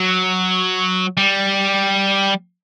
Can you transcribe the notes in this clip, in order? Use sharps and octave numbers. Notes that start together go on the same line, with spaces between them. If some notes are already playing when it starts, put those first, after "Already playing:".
Already playing: F#3
G3